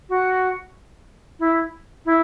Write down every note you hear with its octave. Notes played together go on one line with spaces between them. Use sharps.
F#4
E4
E4